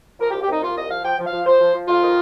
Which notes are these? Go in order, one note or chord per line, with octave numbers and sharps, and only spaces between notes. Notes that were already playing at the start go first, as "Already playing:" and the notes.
F3 A#4
G4
C2
G4
C2 D#4
A#2 F4
C2 D#5
F3 F5
F3 G5
F3
F5
F3
F3 C5
F3
F3
F2 F4
D#3